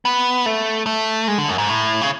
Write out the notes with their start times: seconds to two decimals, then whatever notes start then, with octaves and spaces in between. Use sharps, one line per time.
0.05 B3
0.46 A3
0.86 A3
1.28 G#3
1.38 D3
1.49 F#2
1.58 G#2
1.69 A2
2.01 C#3